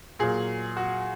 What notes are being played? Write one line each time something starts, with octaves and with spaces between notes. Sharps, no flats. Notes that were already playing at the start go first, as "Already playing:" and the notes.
A#2 F#3 A#3 G#4
F#4